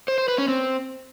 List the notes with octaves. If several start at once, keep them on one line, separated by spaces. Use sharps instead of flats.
C5
C5
B4
C#4
C4